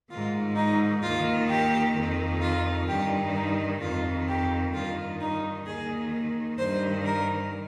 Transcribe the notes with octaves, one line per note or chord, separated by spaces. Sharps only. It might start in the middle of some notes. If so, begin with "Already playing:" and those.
G#2 D#3 F4
D#4
D#2 D#3 F4
G4
F2 D#3
F4
G2 D#3 G4
D#4
F2 D#3 F4
G4
G2 D#3 F4
D#4
D#2 D#3 G#4
G2 D#3 C5
A#4